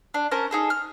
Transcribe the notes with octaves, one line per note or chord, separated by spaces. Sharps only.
D4
C#4 A#4 C5 A5
D#4 G#4 A4
F6